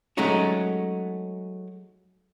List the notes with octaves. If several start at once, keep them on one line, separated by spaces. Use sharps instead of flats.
F#3 G#3 A3 C#4 D#4 F#4